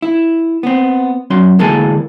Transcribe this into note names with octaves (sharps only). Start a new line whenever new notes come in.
E4
B3 C4
F#3 C#4 C6
D2 E3 G#3 A#3 A4 G#5